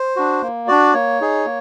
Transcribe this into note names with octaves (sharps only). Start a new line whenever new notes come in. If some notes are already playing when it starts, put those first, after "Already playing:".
Already playing: C5
D4 F#4
A#3
D4 F#4 D5
A#3 C#5
D#4 G#4
A#3